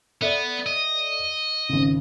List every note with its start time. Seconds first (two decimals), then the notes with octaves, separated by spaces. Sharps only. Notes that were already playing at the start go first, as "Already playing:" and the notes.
0.22 B3 A4 D5 E5
0.67 D#5
1.69 G#1 C#2